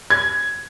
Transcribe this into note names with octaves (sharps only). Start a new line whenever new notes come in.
G#6